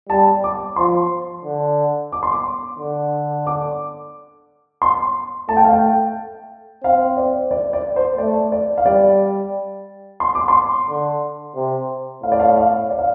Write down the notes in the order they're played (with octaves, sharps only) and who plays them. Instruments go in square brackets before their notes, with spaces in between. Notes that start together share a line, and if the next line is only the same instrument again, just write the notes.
[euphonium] G3 [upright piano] A5
[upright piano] D6
[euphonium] F3 [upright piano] C6
[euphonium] D3
[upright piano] D6
C6
D6
[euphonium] D3
[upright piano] D6
C6
[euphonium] A3 [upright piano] A5
[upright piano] G5
F5
G5
[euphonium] C4 [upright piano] F5
[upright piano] D5
D5
D5
C5
[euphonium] A3 [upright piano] D5
[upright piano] D5
F5
[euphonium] G3 [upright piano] D5
[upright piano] C6
D6
C6
[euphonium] D3
C3
[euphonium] A2 [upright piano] F5
[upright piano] D5
F5
F5
D5
F5